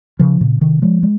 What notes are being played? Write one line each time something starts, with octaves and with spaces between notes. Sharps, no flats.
C#3 F3
A#2 C#3
C3 D#3
F3 G#3
G#3